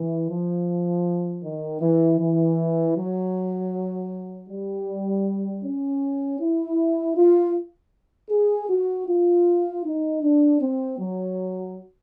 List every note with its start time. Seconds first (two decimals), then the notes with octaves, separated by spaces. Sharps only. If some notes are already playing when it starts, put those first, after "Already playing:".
Already playing: E3
0.28 F3
1.43 D#3
1.81 E3
2.19 E3
2.96 F#3
4.49 G3
5.63 C#4
6.39 E4
7.16 F4
8.30 G#4
8.69 F#4
9.07 F4
9.84 D#4
10.22 D4
10.60 C4
10.98 F#3